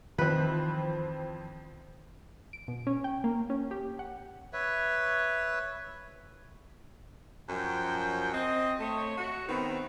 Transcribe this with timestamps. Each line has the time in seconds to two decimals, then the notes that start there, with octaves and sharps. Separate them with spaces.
0.18 F2 D#3 E3 C4 B4
2.53 D7
2.68 B2
2.87 C#4
3.04 G5
3.24 A#3
3.50 C#4
3.71 G4
3.99 F#5
4.53 B4 C#5 E5
7.49 F#2 F3 F#4 G5
8.33 C4 D#5
8.80 A3 C#5
9.18 F#4
9.49 D#3 B3 C4 E4